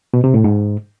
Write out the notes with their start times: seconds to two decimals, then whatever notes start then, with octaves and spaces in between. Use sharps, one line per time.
0.14 B2
0.24 C3
0.34 A2
0.44 G#2